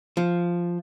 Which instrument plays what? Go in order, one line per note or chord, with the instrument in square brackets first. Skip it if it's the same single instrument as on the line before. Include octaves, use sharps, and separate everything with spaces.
[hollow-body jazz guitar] F3